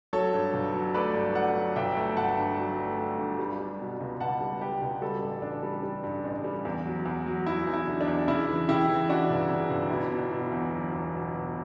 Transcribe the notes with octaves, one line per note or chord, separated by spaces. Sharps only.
F#3 A4 C#5
G2
G1
F#3
A3 B4 D5
G2
A3 D5 F#5
F#3
G1 E5 G5
A3
G1 F#5 A5
G2
F#3
A3
A3
G2
G3
G3
B2
C#2
B2 F#5 A5
G3
G3 G4 B4
C#2
G3 F#4 A4
A1
A1 D4
G3
G3
G2
A1
G3
E2
F#3
E2
F#3
F#3 E4
E2
E4
D3
D4
E2
C#3 E4
E3
C#3 E4 G4
E3
C#3 D4 F#4
G1
C#3
G1
B2 E4
B2
B2
E2
F#3
E2
B2
B2